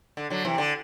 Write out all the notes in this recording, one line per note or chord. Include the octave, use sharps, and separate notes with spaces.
D3
D3 F#3
C3 E3
D3